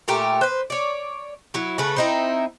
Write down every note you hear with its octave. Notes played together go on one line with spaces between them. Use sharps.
A#2 A3 G4 A#4
B4 C5
C#5 D5
F#3 E4
C#3 A3 C#4 B4
C4 D#4 E4